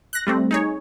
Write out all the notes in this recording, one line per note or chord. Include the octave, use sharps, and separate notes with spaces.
F#6 A#6
G3 A3 C4
D#4 G#4 C#5